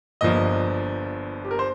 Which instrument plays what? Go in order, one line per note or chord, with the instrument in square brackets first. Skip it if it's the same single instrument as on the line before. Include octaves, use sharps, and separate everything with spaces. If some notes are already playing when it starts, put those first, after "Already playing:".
[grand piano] G1 G2 F3 A#3 D#5
G4
A#4
C5